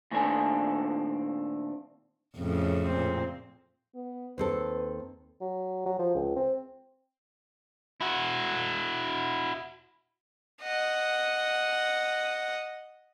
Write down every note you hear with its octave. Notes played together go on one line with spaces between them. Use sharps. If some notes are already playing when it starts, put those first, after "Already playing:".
A#2 D#3 A3 C4 D4 G#5
F2 A2 C#3
A#2 C4
B3
D#2 C4 A4 B4
F#3
F#3
F3
C#2
C4
E4 F#4
D#5 F#5